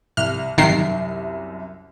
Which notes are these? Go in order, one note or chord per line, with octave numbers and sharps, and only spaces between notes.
C2 F6
C2 F#2 D#3 C7